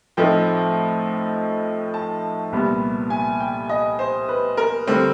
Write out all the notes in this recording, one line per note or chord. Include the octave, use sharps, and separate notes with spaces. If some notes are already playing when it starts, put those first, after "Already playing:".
A2 F3 A3 C4 D#4 G5
A5
C2 A#2 G3 B3
G#5
G5
D#5
C5
B4
A#4
D3 G3 C4